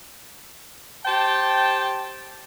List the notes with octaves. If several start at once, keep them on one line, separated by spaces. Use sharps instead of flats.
G4 C5 G5 A5